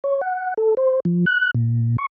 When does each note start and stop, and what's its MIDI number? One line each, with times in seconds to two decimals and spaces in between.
0.04 0.21 73
0.21 0.54 78
0.57 0.75 69
0.77 1.00 72
1.05 1.25 53
1.26 1.51 90
1.55 1.96 46
1.98 2.06 85